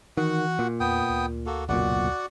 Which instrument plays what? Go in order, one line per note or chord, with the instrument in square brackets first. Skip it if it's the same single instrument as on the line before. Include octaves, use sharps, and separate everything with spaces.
[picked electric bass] D#3 [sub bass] E3 [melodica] F#4 F#5
[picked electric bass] A#2
[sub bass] E2 [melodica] B3 G5 D#6
[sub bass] D2
[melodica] A#3 F#4 A4
[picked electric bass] F#1 B1 A#2 [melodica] F#4 D5 F#5